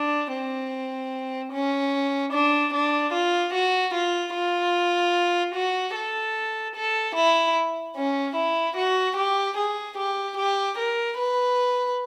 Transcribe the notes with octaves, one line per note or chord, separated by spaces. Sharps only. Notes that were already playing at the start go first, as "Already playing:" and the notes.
Already playing: D4
C4
C#4
D4
D4
F4
F#4
F4
F4
F#4
A4
A4
E4
C#4
E4
F#4
G4
G#4
G4
G4
A#4
B4